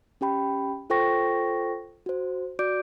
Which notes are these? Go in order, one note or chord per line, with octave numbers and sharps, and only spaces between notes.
C#4 G4 G5 B5
F4 A4 C5 G5 C#6 A#6
F#4 C5
F#4 D5 D6 G6 D7